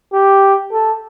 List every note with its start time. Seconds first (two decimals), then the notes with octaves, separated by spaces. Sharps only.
0.13 G4
0.72 A4